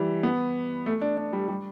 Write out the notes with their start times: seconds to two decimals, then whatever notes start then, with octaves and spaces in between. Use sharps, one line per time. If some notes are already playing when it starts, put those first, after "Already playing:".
Already playing: E3 G3
0.23 B3
0.86 A3
1.01 D4
1.17 D4
1.33 G3
1.48 G3